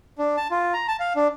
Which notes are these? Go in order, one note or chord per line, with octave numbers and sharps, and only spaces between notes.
D4
A5
F4
A#5
A5
F5
D4